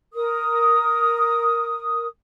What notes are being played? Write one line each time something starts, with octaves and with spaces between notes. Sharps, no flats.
A#4 D#6